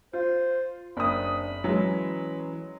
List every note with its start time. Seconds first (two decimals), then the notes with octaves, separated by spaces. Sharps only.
0.13 F4 C5
0.97 F#1 C4 D4 B5 D#6
1.64 E3 F#3 G#3 C#4